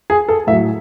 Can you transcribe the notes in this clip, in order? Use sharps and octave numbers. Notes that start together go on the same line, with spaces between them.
G#4
A4
A2 F#3 E5